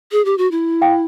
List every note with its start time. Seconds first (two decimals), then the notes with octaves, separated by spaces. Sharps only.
0.12 G#4
0.25 G4
0.38 F#4
0.51 E4
0.82 F5 G5